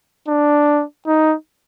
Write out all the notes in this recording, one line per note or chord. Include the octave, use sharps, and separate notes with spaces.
D4
D#4